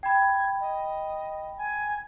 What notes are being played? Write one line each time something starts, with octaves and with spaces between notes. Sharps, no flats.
G5 B5 G#6
D#5
G#5